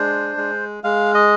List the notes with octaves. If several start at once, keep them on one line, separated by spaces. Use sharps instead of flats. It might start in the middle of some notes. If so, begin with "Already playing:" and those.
Already playing: G#3 D4 C5
G#3
G#3 F5
D#5